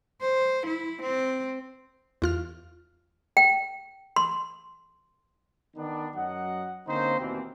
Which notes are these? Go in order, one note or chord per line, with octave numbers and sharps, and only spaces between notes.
C5
E4
C4
E2 F4 F6
G5
C6
D#3 B3 D4
F#2 F#3 D#5 F#5
D3 A#3 C4 C#4 D#4 C5
D#2 B2 E3 A#3 C4